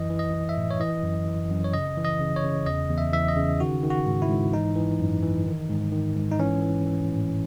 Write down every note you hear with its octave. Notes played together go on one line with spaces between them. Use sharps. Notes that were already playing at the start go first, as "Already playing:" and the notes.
Already playing: F#2 E3 D#5
E3
D#5
E3
E5
A2
C#5
E3 D#5
F#2
E3
F#2
C#5
C#3 D#5
E3
D#5
C#3
C#5
C#3
E2 D#5
E2
E5
E3 E5
D#5
C#3
D#3 F#4
D#3
F#4
G#2
E4
G#2
E3 D#4
E3
F#2
E3
D#3
G#2
D#3
G#2
D#4
E3 C#4
E3
E3
A2